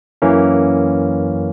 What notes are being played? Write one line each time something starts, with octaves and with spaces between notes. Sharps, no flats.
F#2 E3 A#3 C#4